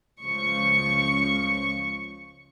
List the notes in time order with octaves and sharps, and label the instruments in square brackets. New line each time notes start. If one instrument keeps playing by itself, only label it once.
[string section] C#2 C#3 F3 C#6